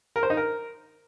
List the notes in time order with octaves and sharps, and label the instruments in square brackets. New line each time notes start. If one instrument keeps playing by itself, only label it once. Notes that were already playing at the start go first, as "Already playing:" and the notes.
[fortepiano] A#4
C5
D#4
A#4